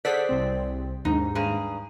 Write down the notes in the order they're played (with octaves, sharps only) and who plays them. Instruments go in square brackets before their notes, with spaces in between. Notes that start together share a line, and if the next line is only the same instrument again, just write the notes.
[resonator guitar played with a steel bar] G#4 C5 D5 [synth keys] A4 F#5 B6
[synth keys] C2 C4
[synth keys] D#2 G#2 [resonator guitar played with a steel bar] D#4
[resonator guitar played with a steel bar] G2 G#4 A#5